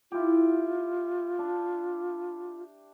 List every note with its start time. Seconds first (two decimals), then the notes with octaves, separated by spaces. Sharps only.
0.12 E4 F4 G4
1.39 D4